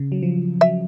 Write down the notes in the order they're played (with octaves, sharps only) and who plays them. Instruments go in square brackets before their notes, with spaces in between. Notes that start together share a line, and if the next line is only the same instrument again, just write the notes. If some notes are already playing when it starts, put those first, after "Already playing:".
Already playing: [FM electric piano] C#3
F#3
F3
[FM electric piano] F#3 [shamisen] E5